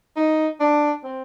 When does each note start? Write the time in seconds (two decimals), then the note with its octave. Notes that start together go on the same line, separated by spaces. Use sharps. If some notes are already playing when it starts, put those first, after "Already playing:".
0.16 D#4
0.60 D4
1.03 C4